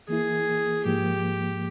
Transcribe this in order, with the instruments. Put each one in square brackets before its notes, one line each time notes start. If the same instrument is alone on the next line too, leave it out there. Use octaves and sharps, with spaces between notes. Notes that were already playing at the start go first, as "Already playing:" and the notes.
[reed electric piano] E3 A#3 E4 [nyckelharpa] G#4
[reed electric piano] G#2 F3 A#3 [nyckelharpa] G4